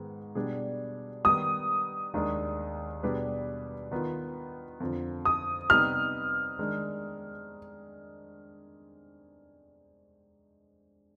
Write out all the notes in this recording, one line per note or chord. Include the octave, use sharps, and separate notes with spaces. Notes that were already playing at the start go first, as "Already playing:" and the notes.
Already playing: G#2 D#3 G#3 B3
B2 G3 D4 G#4
D#3 G3 B3 D#6
D#2 D#3 G#3 D4
B2 G3 D4 G#4 B4
D#3 B3 F4
F2 D3 F3
D#6
C3 G3 B3 D#4 G4 F6
D#3 G#3 D4